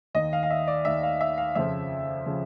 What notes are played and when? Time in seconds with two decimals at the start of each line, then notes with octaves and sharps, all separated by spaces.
0.14 D#2 D#3 D#5
0.33 F5
0.43 F5
0.50 E5
0.67 D5
0.85 D#2 D#3 E5
1.03 F5
1.21 E5
1.38 F5
1.55 F2 C#3 F3 E5
2.26 C#3 F3